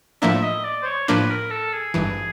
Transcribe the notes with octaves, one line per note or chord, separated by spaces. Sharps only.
A2 F3 A#3 D4 E5
D#5
D5
C5
C#5
A2 F3 A#3 D4 B4
A#4
A4
G#4
G#1 G2 E3